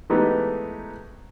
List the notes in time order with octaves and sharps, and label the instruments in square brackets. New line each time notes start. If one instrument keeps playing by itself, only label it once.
[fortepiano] E3 G#3 A3 B3 D#4 G4